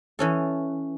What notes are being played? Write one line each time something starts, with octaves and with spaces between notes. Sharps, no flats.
E3 C#4 A4